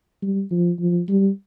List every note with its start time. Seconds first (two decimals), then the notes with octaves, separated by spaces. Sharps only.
0.22 G3
0.51 F3
0.80 F3
1.09 G3